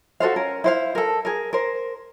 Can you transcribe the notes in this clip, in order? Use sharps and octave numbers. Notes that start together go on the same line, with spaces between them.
F#4 A4 C5 F5
C#4 A#4
E4 C5 F5
A4 A#4
G#4 A#4
A#4 C5